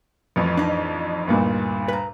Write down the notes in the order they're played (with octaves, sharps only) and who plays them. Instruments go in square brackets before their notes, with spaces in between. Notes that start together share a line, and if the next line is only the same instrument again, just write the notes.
[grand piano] A1 F2
[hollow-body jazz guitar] D4 D#4
[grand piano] D2 G2 A#2
[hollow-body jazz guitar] B4 A#5